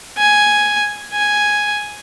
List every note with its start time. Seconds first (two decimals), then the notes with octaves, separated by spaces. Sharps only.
0.18 G#5
1.14 G#5